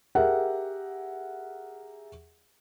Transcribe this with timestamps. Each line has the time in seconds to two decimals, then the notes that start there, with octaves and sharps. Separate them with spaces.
0.15 G4 G#4 A#4 E5 F#5